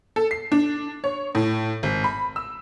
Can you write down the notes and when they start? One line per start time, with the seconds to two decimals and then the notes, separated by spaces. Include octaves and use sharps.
0.16 A4
0.31 C7
0.52 D4
1.04 C#5
1.35 A2
1.83 G#1
2.04 B5
2.36 E6